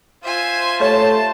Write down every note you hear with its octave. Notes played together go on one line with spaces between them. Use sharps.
F4 C5 E5 G#5
A3 G4 C#5 A5